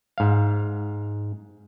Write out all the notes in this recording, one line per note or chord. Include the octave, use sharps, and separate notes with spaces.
G#2 F5